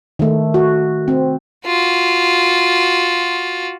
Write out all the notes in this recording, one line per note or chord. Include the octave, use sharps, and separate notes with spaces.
D#3 A3
F#4
C4
F4 F#4